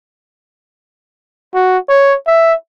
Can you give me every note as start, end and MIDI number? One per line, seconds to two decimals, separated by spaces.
1.55 1.78 66
1.89 2.16 73
2.27 2.54 76